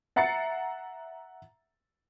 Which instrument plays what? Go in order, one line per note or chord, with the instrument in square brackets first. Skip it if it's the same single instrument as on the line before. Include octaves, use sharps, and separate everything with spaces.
[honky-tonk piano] E5 F#5 A#5 A6 C7 C#7